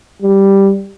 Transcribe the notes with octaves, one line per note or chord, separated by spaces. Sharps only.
G3